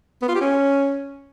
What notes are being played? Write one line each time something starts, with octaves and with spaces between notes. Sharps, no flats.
B3
F4
G4
C#4